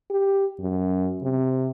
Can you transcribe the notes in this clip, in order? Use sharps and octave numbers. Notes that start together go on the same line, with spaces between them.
G4
F#2
C3